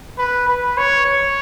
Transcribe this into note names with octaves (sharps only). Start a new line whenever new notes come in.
B4
B4
C#5
C#5